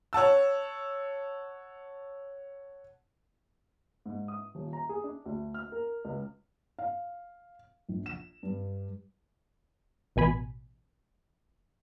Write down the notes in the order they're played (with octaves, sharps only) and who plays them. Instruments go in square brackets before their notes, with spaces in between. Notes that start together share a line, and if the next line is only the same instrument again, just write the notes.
[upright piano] C#5 F#5 A5 E6
G#2
D#6
D#1
A#5
G#4
D4
D2
F6
A#4
C#2
[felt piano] F5
A#1
E7
G2
[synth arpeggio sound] A1 B2 G#5 B5